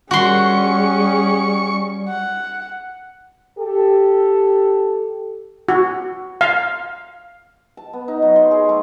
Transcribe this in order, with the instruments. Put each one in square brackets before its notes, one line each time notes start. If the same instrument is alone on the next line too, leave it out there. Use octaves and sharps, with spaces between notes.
[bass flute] G3 [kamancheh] C#4 G#4 [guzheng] F#4 C6 [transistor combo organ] C#6
[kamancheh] F#5
[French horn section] G4 A4
[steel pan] F#4
F5
[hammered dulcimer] A5
B3
D#4
F#3
C6
G#4
A3